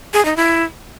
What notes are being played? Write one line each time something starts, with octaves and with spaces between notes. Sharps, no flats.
G#4
D#4
E4